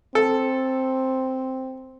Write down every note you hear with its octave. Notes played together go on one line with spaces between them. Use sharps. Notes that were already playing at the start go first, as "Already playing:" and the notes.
C4 A4